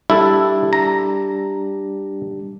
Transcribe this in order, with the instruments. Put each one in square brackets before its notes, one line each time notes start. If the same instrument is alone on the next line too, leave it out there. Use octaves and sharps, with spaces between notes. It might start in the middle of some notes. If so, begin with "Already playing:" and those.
[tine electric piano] G3 D4 G4 [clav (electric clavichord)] E4 A4
[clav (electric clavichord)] A#5